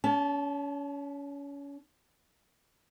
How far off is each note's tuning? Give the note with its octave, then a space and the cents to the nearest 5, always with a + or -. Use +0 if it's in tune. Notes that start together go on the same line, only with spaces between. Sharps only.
C#4 +30 A5 -20